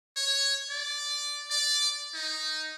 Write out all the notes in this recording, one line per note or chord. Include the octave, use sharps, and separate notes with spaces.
C#5
D5
D5
D#4